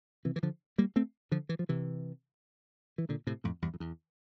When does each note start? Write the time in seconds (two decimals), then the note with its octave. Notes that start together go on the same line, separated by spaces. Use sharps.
0.25 C3 E3
0.36 E3
0.43 D3 F3
0.78 G3 A#3
0.96 A3 C4
1.32 D3 F3
1.49 E3
1.59 F3
1.69 C3 E3
2.98 E3
3.09 A#2 D3
3.27 A2 C3
3.44 F2 A2
3.62 E2 G2
3.74 F2
3.80 E2